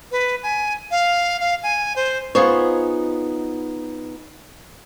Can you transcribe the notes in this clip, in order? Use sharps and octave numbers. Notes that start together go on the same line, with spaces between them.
B4
G#5
F5
F5
G#5
C5
B3 D#4 F4 G#4 C5 C#5